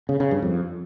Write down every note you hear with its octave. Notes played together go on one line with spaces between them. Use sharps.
C#3
C#3
G2
F2